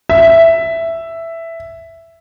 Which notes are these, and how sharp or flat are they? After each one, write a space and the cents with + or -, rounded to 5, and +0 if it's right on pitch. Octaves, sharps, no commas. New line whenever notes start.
E5 +5